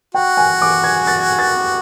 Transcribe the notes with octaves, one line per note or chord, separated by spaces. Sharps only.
F#4 G5
G#5
D6
G#6
A6
A6